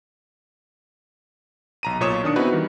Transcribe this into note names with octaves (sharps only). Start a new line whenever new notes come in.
B1 A#5 D#7
B1 A#2 C#5 D#6 E7
D#3 D4 D#6 C#7
B3 C4 D#4 E4 F#4 B4
D#3 E3 G3